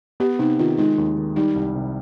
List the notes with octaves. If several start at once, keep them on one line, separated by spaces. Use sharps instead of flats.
B3 G4
C3 D#4
D#3 F4
G#3 D#4
D#2
D#3
G3 D#4
C2
C3